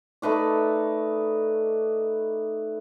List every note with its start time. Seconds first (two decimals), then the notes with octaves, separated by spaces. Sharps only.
0.22 A3 D#4 B4 D5